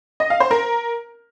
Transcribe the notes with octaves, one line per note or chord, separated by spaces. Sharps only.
D#5
F5
C5
A#4